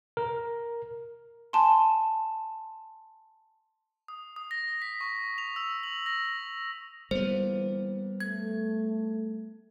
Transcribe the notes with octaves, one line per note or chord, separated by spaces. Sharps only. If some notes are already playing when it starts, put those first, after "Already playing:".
A#4
G#5 A5 C6
D#6
D#6
A#6
B6
C#6
F7
E6
F#7
A#6
G1 E3 G3 A#3 B3 C5
A3 G#6